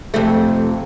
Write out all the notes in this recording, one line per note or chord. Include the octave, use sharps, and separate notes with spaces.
F2 C3 A3